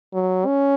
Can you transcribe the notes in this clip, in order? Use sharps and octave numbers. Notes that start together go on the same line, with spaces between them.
F#3
C#4